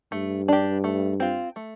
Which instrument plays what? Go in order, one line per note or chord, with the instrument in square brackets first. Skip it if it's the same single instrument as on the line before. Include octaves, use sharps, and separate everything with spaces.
[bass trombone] G2 [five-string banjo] A3
[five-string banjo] D4 G4
A3
C4 F4
A3